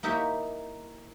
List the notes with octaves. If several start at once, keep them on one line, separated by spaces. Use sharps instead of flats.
A#3 D#4 E4 G4 C#5 E5